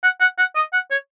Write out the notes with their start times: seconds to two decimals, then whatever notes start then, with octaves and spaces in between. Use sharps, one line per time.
0.03 F#5
0.21 F#5
0.38 F#5
0.56 D#5
0.73 F#5
0.91 C#5